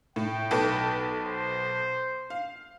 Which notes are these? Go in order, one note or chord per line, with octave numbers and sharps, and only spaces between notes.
A2 G5
B1 A4 B4
C5
F5